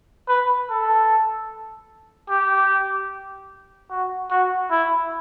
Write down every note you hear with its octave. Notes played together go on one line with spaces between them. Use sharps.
B4
A4
G4
F#4
F#4
E4